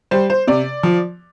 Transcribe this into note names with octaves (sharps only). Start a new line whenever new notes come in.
G3 C5
C5
C3 D5
F3